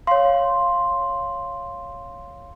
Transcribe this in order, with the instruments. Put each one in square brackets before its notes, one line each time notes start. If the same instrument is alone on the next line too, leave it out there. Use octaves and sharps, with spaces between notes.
[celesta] C#5 F5 [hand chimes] C6